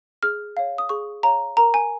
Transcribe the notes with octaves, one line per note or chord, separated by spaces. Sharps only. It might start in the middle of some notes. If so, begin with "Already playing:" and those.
G#4 F6
C#5 F5
D#6
G#4 C#6
C#5 F5 A#5
A#4 A#5
G#5